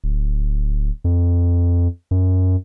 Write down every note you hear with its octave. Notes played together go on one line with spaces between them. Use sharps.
D1
F2
F#2